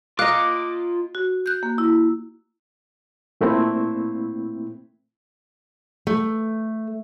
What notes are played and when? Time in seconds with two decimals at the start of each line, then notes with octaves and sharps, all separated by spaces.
0.19 F4 D#5 F5 A#5 D6 F#6
1.15 F#4
1.46 F#6 G6
1.63 A#3
1.78 E4
3.41 A#2 A3 A#3 C4 E4
6.07 A3